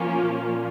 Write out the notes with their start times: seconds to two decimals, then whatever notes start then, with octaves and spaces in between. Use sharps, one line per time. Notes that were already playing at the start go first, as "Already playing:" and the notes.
Already playing: F3 A#3 C#4 F4
0.15 A#2